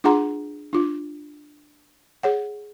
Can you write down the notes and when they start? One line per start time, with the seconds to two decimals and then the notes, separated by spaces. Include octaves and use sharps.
0.04 D4 F4 G#4 F#5 A#5 C6
0.73 D4 F4
2.23 G#4 C#5 F#5